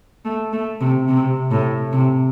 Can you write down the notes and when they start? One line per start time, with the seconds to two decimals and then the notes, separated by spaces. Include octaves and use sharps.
0.25 A3
0.53 A3
0.81 C3
1.08 C3
1.51 A2
1.93 C3